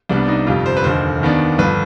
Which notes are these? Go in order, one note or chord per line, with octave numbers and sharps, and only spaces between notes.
C2 C3 G3 B3 D4 D5
D#4
G1 F2 C3 G3 F4
C5
B4
F1 D#2 D3 C5
D#2 D#3 B3 D4
G1 F3 B4